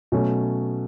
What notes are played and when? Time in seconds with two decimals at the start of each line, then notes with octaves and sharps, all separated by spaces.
0.12 B2 F#3 A3 C#4